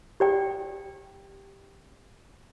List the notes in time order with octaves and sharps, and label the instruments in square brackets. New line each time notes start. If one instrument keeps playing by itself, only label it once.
[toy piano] G4 D5 G5